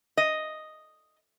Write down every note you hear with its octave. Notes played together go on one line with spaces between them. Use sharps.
D#5